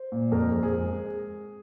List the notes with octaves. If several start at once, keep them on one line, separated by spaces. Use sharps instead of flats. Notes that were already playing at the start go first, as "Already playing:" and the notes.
Already playing: C5
A#2
F2 A#4
F2
G#4
G#3